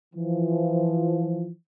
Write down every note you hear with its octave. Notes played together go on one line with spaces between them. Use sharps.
E3 F3